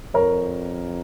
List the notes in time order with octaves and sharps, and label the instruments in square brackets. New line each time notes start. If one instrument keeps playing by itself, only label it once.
[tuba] F2 [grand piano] A#4 C#5